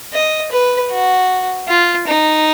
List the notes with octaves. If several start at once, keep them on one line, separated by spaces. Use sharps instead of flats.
D#5
B4
F#4
F4
D#4